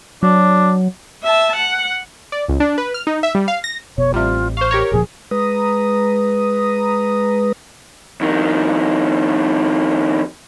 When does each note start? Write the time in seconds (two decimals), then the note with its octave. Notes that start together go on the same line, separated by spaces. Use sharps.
0.23 F#3 D4
1.23 E5 A5
1.56 F#5
2.32 D5
2.49 C#2
2.60 D4
2.78 B4
2.94 F6
3.07 D#4
3.23 E5
3.35 G3
3.48 F5
3.64 A#6
3.98 F1 B2 C#5
4.14 A1 C3 G3 F4
4.57 C5 F5 C#6
4.71 G4 A#4 C#5
4.91 D1 A#2 F3 G#4
5.31 G#3 B4 A#5 D#6
8.21 F2 D#3